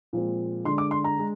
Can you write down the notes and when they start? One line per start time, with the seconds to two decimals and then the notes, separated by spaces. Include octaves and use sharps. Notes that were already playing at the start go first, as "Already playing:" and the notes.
0.13 A#2 F3 G#3 C4
0.65 D3 G#3 D4 C6
0.78 D6
0.91 C6
1.04 A#5
1.17 G#3 D4